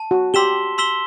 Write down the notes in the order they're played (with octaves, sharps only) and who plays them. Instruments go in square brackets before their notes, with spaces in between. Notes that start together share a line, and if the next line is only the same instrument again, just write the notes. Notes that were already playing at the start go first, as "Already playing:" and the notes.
Already playing: [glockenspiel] A5
[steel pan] F#4
[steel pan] G4 [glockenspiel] C6 E6 B6 E7 G7
[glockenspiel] C6 E6 B6 E7 G7